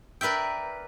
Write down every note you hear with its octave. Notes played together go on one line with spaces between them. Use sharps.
A#4 B4 D5 E5 G5